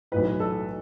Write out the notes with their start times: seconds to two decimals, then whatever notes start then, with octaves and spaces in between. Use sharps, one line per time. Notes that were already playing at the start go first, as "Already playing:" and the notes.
0.12 B1 A2 E3 B4
0.40 A4